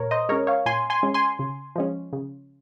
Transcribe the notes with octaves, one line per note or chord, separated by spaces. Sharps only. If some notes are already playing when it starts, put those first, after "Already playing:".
Already playing: A#2 A#4 C#5
C5 D#5
G#3 C#4 A#4 C#5
C#5 F5
A#2 G#5 C6
G#5 C6
G#3 C#4
G#5 C6
C#3
F3 G#3 C#4
C#3